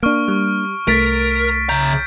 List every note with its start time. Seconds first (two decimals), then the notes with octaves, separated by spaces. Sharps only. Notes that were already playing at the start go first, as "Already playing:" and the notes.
0.03 A#3 D4 C#6 F6 D7
0.28 G3
0.88 C2 A3 A#4 A6 B6 D7
1.69 C#3 A#5 G6